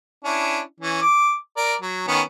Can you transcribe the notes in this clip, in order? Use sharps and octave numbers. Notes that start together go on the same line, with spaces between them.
C#4 D4 E4
E3 C#4
D6
A#4 D5
F#3
D#3 B3 C#4